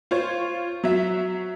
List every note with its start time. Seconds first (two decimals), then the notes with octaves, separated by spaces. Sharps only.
0.11 F4 C5 C#5
0.84 F#3 E5